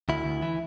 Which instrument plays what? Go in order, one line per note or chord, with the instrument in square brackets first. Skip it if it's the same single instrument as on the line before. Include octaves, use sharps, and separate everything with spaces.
[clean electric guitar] D2 E4
D2
E3